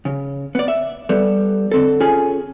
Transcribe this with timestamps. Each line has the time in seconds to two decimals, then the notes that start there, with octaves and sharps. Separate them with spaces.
0.05 C#3
0.55 B3 D5
0.68 E5
1.09 G3 B3 A4
1.72 D3 C4 A4
2.00 C#4 F4 G#4 A4 G#5